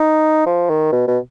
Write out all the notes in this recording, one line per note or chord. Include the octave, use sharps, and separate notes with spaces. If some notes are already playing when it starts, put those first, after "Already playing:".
Already playing: D#4
F3
D#3
B2
B2